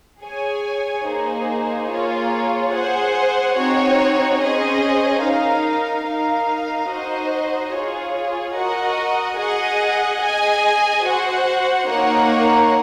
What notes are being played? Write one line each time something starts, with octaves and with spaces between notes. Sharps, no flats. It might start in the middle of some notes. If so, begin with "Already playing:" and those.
G#4 C#5 G#5
A#3 D#4 G#4 C5
A#3 F4 G#4 C#5
G#4 C5 F#5
C4 D#4 F#4 C#5
C#4 G#4 C5 D#5
D#4 A#4 F5
D#4 A#4 F5
D#4 F#4 C5 D#5
F4 G#4 C#5
F#4 A#4 D#5 F#5
G#4 D#5 F#5
G#4 D#5 G#5
F#4 C5 F#5
A#3 D#4 A#4 C#5 F#5